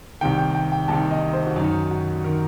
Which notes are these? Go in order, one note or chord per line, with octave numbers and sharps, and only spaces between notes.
C2 C3 D#3 G5
G5
G5
G5
C2 C3 D#3 A5
D#5
C5
F#4
F#2 D#3 D#4
F#4
D#3 A#4